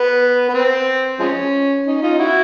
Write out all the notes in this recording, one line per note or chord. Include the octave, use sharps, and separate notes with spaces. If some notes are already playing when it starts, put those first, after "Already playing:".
Already playing: B3
B3
C4
F3 G#3 C#4
C#4 D#4
D#4 F4
E4 F#4